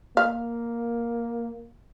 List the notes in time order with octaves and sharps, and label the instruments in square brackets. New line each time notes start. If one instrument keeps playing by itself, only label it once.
[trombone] A#3 [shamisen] F5